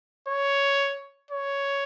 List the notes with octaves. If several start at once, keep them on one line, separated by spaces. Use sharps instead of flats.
C#5
C#5